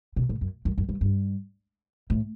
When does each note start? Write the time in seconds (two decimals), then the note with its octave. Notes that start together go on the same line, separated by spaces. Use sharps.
0.16 B2
0.29 A2
0.41 F#2
0.65 F#2
0.78 F#2
0.89 G2
1.01 G2
2.10 A2